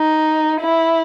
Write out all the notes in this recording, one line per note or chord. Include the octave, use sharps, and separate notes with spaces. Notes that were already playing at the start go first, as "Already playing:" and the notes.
Already playing: D#4
E4